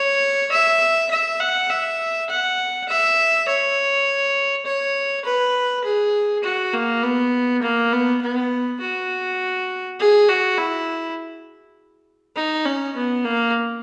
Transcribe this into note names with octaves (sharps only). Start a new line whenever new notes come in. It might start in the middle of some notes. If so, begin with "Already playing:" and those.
Already playing: C#5
E5
E5
F#5
E5
F#5
E5
C#5
C#5
B4
G#4
F#4
A#3
B3
A#3
B3
B3
F#4
G#4
F#4
E4
D#4
C#4
B3
A#3